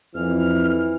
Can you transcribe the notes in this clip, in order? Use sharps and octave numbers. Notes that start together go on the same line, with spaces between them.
F2 E3 F6